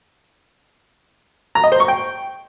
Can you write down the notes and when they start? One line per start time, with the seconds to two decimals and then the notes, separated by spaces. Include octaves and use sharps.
1.55 A#5
1.64 D#5
1.72 C5
1.80 C#6
1.88 G5